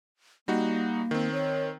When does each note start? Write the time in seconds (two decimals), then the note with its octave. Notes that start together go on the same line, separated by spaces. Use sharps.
0.48 G3 A#3 D#4 F#4
1.11 D#3 C4
1.33 C#5